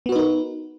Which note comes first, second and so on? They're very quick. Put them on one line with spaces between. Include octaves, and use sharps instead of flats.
B3 F#4 B4 D#4 A#4